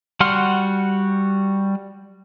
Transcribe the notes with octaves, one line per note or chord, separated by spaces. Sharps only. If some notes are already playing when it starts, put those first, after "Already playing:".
G3 F#4 F#5 C6 F6